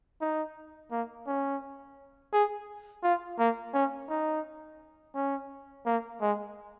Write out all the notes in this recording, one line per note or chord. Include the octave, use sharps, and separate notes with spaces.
D#4
A#3
C#4
G#4
F4
A#3
C#4
D#4
C#4
A#3
G#3